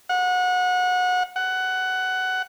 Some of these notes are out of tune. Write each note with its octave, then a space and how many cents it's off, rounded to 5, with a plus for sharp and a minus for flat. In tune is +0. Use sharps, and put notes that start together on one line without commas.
F#5 -25
F#5 +15